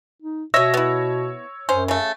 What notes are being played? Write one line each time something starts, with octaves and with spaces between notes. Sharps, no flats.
D#4
B2 C#5 D#5 E5 E6 A#6
B3 E4
F#2 C#4 C5
C#3 A3